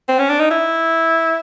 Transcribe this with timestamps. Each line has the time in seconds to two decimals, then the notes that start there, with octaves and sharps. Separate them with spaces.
0.08 C4
0.19 C#4
0.30 D4
0.40 D#4
0.51 E4